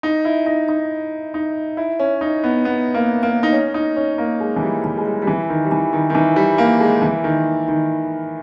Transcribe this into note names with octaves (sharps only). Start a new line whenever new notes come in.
D#4
E4
D#4
D#4
D#4
E4
C#4
D#4
B3
B3
A#3
A#3
D#4
C#4
D#4
C#4
A#3
G#3
E3
G3
E3
G#3
G3
G3
E3
D#3
G3
E3
D#3
D#3
E3
G3
A#3
G#3
E3
D#3
D#3